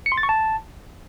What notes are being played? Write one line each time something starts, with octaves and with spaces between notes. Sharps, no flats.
C#7
C6
A6
C#6
A5